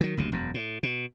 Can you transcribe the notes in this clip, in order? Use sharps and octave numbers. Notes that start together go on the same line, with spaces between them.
D#3 F#3
F#1 D2 C3
E1 F#2
A2
B2